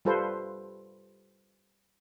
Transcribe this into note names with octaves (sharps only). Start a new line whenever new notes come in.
G3 F4 A4 B4 C5